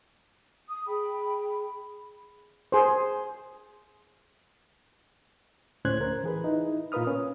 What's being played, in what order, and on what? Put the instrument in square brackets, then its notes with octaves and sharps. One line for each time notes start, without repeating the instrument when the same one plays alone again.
[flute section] D#6
[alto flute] G#4 [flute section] G5 B5
[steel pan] G#4 C5
[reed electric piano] D2 A2 C#4 C5 F#6 G#6
A#4 C5
E3 G#4 B4
D#4 E4
A#2 F4 A#4 B4 D#6 F6
C#4